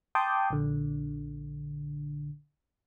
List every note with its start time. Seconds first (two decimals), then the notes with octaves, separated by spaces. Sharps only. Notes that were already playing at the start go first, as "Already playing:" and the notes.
0.15 G5 A5 C6 D6 D#6 G6
0.50 A#1 D3